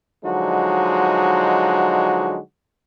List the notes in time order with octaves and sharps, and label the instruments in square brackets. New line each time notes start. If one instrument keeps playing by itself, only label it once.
[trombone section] D3 F3 F#3 G#3 D#4 F#4